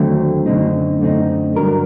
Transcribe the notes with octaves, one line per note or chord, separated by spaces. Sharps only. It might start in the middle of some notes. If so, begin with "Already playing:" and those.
Already playing: D#2 D3 F#3 A3 C4
F#2 D3 A3 C4 D#4
F#2 D3 A3 C4 D#4
G2 D3 F#3 A#4